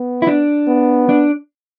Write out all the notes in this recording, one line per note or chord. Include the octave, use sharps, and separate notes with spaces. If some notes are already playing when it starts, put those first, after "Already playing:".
Already playing: B3
E4
D4
B3
D4